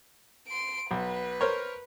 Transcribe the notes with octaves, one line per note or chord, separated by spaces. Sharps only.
C6 D7
B1 B4
A#4 C5 C#5